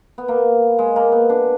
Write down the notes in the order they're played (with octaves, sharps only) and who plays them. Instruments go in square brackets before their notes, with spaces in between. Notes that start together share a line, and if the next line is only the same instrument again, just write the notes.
[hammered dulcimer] B3
A#3
G#3
A#3
B3
D4